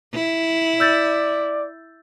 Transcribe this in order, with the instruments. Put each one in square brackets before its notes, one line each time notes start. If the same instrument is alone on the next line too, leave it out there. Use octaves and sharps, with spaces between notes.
[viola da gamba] E4
[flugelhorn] D5 [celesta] E6 G6 A6